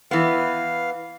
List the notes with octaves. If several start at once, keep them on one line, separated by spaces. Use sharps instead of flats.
E3 B3 F5